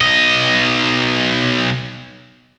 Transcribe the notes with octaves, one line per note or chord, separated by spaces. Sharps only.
B1 D#5